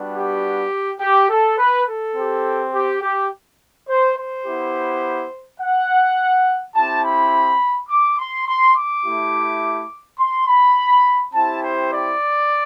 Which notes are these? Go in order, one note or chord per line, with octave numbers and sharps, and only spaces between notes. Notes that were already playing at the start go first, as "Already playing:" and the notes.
Already playing: G3 B3 D4 F#4
G4
G4
A4
B4
A4
C4 G4
G4
G4
C5
C5
B3 E4 G4
F#5
C4 E4 G4 A5
B5
D6
C6
C6
D6
A3 E4 G4
C6
B5
C4 E4 G4 A5
C5
D5